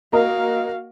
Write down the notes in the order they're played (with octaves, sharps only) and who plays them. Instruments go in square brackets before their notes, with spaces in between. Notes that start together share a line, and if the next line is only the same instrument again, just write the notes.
[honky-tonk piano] A#3 A#4 D#5 [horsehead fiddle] F#4 F5